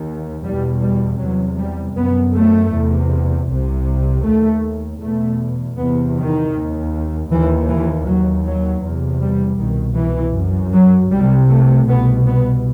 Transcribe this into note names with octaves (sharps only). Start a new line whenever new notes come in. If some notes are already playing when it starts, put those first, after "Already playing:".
Already playing: D#2
E2 B2 G3
G3
E2 C3 F#3
G3
F#2 B3
A3
E2 C3
C2 C3
D#2 A3
E2 B2 A3
E2 C3 B3
D#3
D#2
D#2 E3
E3
D#2 F#3
F#3
E2 C3
G3
C2 B2 D#3
E3
F#2
F#3
C2 C3 G3
A3
C2 B2 B3
B3